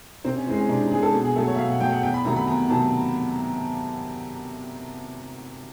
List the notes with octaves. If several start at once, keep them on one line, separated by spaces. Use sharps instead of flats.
C3 C4
C#4
E3 G#3 C4
C#4
C3 D4
D#4
E3 G#3 G#4
A4
B2
G#4
F#3 A3 A4
C#5
E5
B2 F5
F#5
F#3 A3 G5
F#5
E2 G5
B5
C3 D#3 F#3 A3 A#5
B5
E2 A#5
C3 D#3 F#3 A3 A5